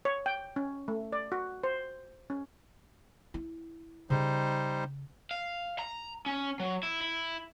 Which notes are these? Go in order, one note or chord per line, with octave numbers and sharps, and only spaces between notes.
C#5
G5
C#4
A3
D5
F#4
C5
C#4
E4
C#3 G3 D#4 C5
F5
A#5
C#4
F#3
E4
E4